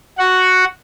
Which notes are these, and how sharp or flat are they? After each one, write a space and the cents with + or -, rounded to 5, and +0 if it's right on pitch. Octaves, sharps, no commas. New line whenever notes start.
F#4 +0 F#5 +0